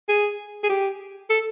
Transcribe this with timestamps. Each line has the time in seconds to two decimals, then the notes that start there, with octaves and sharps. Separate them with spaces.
0.09 G#4
0.64 G#4
0.69 G4
1.30 A4